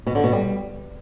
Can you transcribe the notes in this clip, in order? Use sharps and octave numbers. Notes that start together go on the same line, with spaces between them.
B2
D3
B2
G3